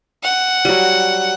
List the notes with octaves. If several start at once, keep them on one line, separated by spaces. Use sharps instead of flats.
F#5
F#3 G3